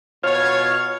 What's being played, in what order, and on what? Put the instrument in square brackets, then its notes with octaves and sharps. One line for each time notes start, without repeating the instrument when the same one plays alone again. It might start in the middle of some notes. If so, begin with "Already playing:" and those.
[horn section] B2 C#5 [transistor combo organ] F4 F5